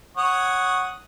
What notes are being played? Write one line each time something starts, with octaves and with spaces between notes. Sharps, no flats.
C#5 F#5 D#6